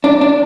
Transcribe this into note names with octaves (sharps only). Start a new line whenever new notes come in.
D4
D4